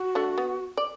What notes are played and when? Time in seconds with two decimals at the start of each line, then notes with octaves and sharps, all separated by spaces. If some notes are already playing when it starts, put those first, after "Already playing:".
Already playing: F#4
0.15 A3 D4
0.38 B3
0.77 D5